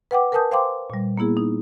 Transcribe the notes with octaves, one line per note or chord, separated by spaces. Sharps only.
B4 F#5 G5 D6
A#4 B4 G#5 A5 D#6 G6
C5 F5 G5 C6 D6
A#2 G3
A#3 B3 E4 G#4
D#4